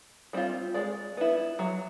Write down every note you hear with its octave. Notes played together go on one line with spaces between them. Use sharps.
G3 C4 F4
G#3 D5
B3 E4
F#3